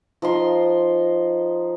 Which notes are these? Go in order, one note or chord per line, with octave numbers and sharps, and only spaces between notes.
F3 D#4 C6